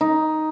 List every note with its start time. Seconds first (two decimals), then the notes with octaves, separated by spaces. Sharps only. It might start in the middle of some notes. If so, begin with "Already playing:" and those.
0.01 D#4